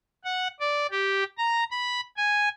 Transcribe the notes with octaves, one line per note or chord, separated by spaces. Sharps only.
F#5
D5
G4
A#5
B5
G#5